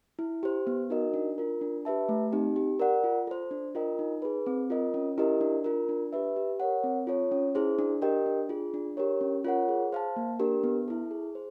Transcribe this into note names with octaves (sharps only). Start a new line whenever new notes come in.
E4
G4 C5
B3
D#4 F#4 A#4 D#5
D4
F4 A#4
D4
G4 B4 E5 A5
A3
C4 D#4 G4
G4
A#4 D5 F#5
F4
A4 C5
D4
F4 A#4 D#5 G5
D#4
G#4 B4
C4
F4 A#4 D#5
C#4
E4 G4 A#4 D#5
D4
F4 A#4
D4
G4 B4 E5
G4
A#4 C#5 F#5
C4
F4 A4 C#5
C#4
E4 G#4 C5
D4
G4 A#4 D#5 G5
D4
F4 G#4
D4
G4 A#4 C#5
C#4
F4 A#4 C#5 F#5
G#4
C5 F5 A5
A#3
D4 G4 A#4
B3
E4 A4
G#4
C5